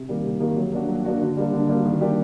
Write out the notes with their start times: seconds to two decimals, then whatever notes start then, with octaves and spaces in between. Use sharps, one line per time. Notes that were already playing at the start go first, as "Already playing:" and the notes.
Already playing: C3
0.09 D#3 G3 A#3
0.24 C3
0.40 D#3 G3 A#3
0.57 F#3
0.72 A#3 D4 F#4
0.89 F#3
1.05 A#3 D4 F#4
1.21 D3
1.37 G3 A#3 D4
1.53 D3
1.69 G3 A#3 D4
1.85 D#3
2.01 G3 A#3 D4 G4